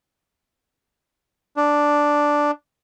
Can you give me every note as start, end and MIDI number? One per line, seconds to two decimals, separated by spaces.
1.57 2.51 62